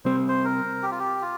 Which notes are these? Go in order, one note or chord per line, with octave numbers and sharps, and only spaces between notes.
C3 G3 C4 C5
C5
A#4
G4
F4
G4
F4